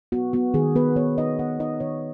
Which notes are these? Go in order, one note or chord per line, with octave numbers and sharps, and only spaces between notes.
B3 F#4
B3 F#4
D#3 G#4
B3 B4
B3 C#5
D#4 D#5
B3 F#5
D#4 D#5
D#3 C#5